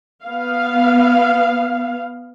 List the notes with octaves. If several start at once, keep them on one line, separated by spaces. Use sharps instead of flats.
B3 F5